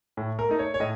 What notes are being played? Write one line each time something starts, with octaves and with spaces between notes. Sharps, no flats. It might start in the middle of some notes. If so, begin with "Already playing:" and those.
A2
A#4
A3 D#4
C#5
C#5
A2 D#5